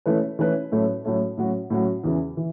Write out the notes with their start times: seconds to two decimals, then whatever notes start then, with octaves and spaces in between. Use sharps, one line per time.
0.06 E3 A3 C#4 E4 B4
0.39 E3 A3 C#4 E4 B4
0.72 A2 F#3 A3 C#4
1.05 A2 F#3 A3 C#4
1.37 A2 F#3 C#4 F#4
1.70 A2 F#3 C#4 F#4
2.03 E2 C#3 E3
2.37 E3